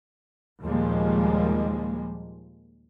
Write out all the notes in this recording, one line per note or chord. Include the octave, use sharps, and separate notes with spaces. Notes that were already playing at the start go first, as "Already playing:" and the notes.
D#2 A#2 F3 G3 G#3 A#3